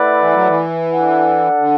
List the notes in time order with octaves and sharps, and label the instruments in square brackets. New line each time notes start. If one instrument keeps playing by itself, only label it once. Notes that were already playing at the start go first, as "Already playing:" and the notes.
Already playing: [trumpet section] A3 E4 B4 D5 F#5
[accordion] E3
F#3
E3
[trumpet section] D4 A4 D5 F#5
[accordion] D3